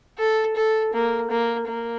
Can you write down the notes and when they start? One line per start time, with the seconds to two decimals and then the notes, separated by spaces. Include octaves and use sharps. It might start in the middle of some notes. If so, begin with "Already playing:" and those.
0.18 A4
0.56 A4
0.93 A#3
1.30 A#3
1.68 A#3